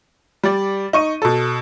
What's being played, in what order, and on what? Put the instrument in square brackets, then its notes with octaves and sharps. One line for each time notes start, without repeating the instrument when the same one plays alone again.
[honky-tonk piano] G3 D5
D#4 C#6 D#7
B2 A4